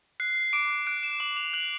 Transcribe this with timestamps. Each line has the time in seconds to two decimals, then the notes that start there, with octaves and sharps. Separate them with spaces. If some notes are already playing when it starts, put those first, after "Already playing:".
0.20 F#6 C7
0.53 D6 D7
0.87 F#6 D7
1.03 E7
1.20 D6 F#7
1.37 F7
1.53 F#6 F#7